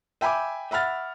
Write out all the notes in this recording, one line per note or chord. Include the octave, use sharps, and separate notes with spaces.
E5 G5 G#5 B5 D6
E5 F#5 B5 F6 A6